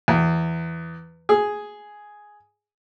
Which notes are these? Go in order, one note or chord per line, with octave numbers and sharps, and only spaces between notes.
E2
G#4